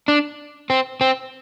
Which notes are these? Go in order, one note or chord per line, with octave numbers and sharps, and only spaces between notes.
D4
C4
C4